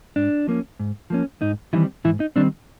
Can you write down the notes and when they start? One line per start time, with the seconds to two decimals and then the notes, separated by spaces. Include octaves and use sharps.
0.16 G#2 D4
0.47 F3 A#3 C#4
0.80 G#2
1.10 F3 A#3 C#4
1.42 G#2 D#4
1.73 D#3 E3 G3 C4 E4
2.04 G#2 E3 E4
2.20 D#4
2.36 D#3 G3 C4 D4